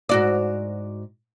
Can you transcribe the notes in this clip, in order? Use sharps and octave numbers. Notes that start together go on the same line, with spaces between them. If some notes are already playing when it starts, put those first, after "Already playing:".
G#2 F#4 D5